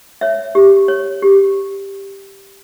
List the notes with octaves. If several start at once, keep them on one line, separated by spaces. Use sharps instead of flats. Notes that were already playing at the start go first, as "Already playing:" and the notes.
C#5 E5
G4
C#5
G4